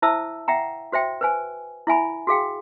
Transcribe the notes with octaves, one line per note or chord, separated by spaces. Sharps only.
E4 C5 E5 A5 D#6 E6
E5 F#5 G5 A#5
F#4 C5 E5 G5
B4 C5 G#5
E4 E5 G#5 B5
F#4 G#4 F5 G5